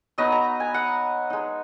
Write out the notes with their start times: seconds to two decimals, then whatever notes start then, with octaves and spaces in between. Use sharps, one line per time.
0.18 F#3 B3 D#4 D#5
0.32 A#5
0.60 G#5
0.74 F#5
1.30 G#3 D#4